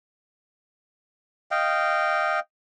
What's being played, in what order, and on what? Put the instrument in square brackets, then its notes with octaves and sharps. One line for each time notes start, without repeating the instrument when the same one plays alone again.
[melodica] D#5 F5 G5